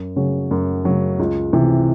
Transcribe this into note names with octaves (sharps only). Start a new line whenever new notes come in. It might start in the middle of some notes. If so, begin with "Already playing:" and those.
Already playing: F#2
C#3 F#3
F#2
C#3 F#3
C#2
C3 E3